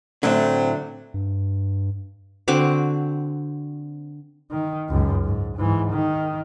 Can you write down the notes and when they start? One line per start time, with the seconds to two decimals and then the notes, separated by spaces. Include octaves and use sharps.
0.23 A2 D3 F#3 A3 C4 E5
1.14 G2
2.48 D3 C4 F#4 D6
4.51 D#3
4.89 C#2 F#2
5.24 G#2
5.57 G#2 E3
5.91 D#3